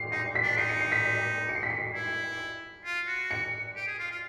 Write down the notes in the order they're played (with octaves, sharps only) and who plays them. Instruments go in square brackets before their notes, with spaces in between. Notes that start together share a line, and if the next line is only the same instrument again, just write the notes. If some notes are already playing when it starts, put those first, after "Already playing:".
Already playing: [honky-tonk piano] C7
[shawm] D#4 [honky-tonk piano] C7
[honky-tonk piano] B6
[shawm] D4
[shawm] D#4 [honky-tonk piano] C7
[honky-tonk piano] C#7
C7
B6
C#7
C7
B6
C7
[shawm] E4
F4
F#4
[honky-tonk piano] C#7
[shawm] G4
G#4
F4
F4